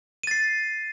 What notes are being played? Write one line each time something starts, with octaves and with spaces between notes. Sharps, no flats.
A6 C7 D#7